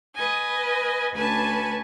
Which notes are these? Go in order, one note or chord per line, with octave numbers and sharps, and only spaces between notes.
B4 D#5 G#5
D2 C#4 B4 G#5 A5 B5